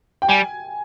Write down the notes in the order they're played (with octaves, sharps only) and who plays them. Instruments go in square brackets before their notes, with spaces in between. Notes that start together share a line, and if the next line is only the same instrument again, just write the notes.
[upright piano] G5
[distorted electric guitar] G3 [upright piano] G#5